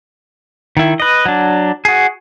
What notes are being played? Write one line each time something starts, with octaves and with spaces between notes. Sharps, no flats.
D#3 E4
B4 D#5
F#3 D4
F#4 G#4